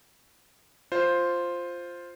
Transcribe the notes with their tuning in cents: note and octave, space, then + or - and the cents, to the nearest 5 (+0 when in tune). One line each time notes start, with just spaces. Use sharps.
F4 +0 C5 +0